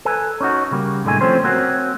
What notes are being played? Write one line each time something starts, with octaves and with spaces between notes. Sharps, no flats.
A4 B4 G#5
C#4 D#4 F#4
C#3 G3 A#3
C2 A2 D3 G#3 A3 G#5
F3 A3 C4 C#4 C5
A#3 C4 C#4 F#4